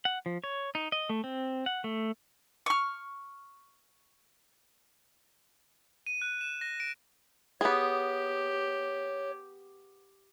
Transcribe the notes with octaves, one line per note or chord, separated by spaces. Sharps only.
F#5
F3
C#5
D#4
D#5
A3
C4
F#5
A3
C#6 F6
D#7
F#6
E7
A#6
D7
B3 G4 G#4 C#5